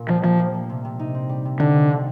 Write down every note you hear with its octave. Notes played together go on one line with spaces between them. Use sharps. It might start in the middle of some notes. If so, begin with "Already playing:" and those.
Already playing: A#2
F3 G3
F3 A#3
A#3
A#3
C3
C3
D#4
C4
G3
C3
D3 D#4
D#3
C4